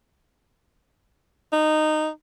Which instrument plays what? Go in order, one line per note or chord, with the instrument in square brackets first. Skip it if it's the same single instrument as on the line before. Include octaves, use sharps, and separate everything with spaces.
[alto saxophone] D#4